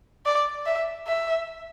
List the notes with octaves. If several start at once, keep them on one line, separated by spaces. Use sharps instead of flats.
D5
E5
E5